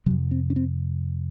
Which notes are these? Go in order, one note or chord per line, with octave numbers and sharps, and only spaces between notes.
F2 C3 F#3
C4
C#4
C4